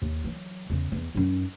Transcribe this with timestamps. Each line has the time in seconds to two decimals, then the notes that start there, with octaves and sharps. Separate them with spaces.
0.02 D#2
0.24 E3 F#3
0.70 E2 C#3
0.92 E2
1.15 F#2 D#4